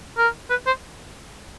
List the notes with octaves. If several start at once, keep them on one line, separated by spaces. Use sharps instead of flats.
A#4
B4
C5